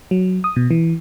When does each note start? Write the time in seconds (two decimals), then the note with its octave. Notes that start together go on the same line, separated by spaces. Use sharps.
0.11 F#3
0.44 D#6
0.56 B2
0.71 E3